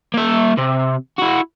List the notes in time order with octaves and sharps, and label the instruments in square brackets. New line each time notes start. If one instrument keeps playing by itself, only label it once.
[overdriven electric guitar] A#3 E5
C3
E4 F#4